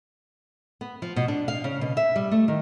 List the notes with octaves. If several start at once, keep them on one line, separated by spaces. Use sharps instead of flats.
B3
F3
B2
D4
F5
C#3
B2
E5
G3
A3
D#3